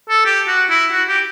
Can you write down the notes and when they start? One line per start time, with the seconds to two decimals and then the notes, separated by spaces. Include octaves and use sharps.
0.09 A4
0.26 G4
0.48 F#4
0.70 E4
0.92 F#4
1.09 G4